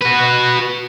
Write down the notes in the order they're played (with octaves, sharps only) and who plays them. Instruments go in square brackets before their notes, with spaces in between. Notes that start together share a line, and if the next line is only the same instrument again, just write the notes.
[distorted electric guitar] F#4 B4